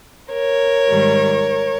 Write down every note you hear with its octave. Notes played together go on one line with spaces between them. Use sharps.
A#4 C#5
G#2 D#3 G3